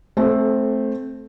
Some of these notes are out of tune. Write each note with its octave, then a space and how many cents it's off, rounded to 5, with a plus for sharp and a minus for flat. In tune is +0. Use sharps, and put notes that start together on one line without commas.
A3 -10 C4 +5 A4 -30